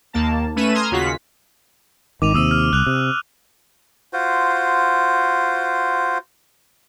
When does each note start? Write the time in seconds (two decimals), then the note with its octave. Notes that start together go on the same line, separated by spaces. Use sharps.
0.13 D#2 A#3 A5
0.56 A3 C#4 B4 D#7 E7
0.74 A#5 C6 D#6 F6 G#6
0.91 D#2 C#3 F4 F#4 F#5 B6
2.22 G#1 D#3 D6 D#7 F7
2.34 D#2 C3 D#6 E6 D#7
2.51 F6
2.73 C2 F#6 F7
2.86 C3
4.13 F4 F#4 C5